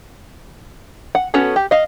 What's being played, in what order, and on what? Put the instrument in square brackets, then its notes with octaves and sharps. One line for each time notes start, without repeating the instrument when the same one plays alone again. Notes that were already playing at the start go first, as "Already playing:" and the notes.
[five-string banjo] F#5
B3 C#4 F#4 A4
G4
D#5 F5